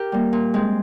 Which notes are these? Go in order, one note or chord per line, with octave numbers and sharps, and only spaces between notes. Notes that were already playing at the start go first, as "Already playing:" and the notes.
Already playing: G4 A#4
G3 A#3
A#2
G#3 C4